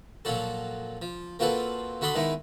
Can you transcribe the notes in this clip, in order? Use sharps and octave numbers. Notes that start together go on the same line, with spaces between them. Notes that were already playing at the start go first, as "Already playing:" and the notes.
A#2 F3 F#3 F#4 A4
F3
A#3 C4 F4 F#4 A4 B4
D3 F#4 A4 B5 C6 D#6
D#3 G#3 B3 D#4 E4